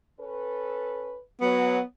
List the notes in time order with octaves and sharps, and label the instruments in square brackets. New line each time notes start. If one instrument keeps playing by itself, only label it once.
[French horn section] C#4 A4 B4
[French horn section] F#3 [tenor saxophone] B3